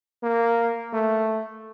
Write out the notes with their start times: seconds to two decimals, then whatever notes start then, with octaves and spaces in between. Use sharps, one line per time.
0.23 A#3
0.93 A3